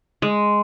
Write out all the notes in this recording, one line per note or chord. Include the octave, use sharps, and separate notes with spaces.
G#3